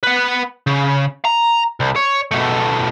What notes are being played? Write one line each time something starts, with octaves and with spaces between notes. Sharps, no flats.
B4 F#5
C#3
A#5
C2
C#5
B2 A3